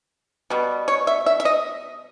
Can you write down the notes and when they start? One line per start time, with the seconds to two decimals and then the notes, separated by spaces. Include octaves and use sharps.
0.50 B2 G3 B3
0.88 C#5
1.07 E5
1.26 E5
1.40 E5
1.45 D#5